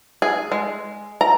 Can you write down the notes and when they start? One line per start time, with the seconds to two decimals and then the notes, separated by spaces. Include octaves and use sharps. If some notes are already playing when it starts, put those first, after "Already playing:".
0.22 G#4
0.52 G#3
1.21 A#5